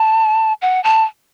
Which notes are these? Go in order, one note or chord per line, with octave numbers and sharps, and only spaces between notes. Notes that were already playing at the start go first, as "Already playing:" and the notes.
Already playing: A5
F#5
A5